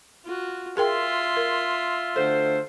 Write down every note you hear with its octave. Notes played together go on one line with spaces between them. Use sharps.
F4 F#4
F4 G#4 A#4 E5 G5 C6
A#4
D2 D3 A4 C5